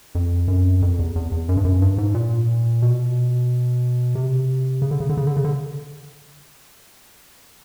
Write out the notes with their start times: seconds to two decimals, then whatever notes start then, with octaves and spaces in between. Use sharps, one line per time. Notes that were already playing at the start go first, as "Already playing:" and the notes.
0.15 F2
0.48 F#2
0.82 F2
0.99 E2
1.16 E2
1.32 E2
1.49 F#2
1.57 G2
1.65 F#2
1.82 G2
1.98 G#2
2.15 A#2
2.82 B2
4.15 C3
4.82 C#3
4.91 D3
5.00 C#3
5.10 D3
5.17 C#3
5.27 D3
5.37 C#3
5.44 D3